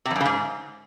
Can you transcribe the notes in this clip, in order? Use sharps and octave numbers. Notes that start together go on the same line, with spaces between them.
C3
F2
F#2
C#3
G#2